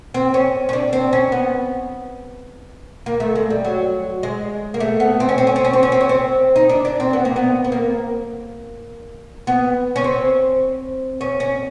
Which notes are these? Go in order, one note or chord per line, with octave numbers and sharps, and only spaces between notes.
C4
C#4
C#4
D4
C4
C#4
B3
A#3
A3
G#3
G3
F#3
G#3
A#3
A3
B3
C4
C#4
C4
C#4
C4
C#4
C4
C#4
C4
C#4
C4
D#4
D4
D4
C4
B3
A#3
B3
B3
A#3
B3
C#4
C4
C#4
C#4